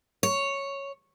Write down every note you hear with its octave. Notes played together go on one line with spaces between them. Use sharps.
C#5